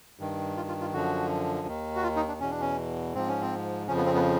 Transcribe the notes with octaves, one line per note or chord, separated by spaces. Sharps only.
G2 D#3
F4
F4
F4
F#2 D3 F3 F#4
D#2 D#3
F#4
F4
D#4
D4
E2 B2 C#4
D4
C#4
G#2 F3 C4
C#4
C4
F2 C#3 F3 C#4
B3
C4
B3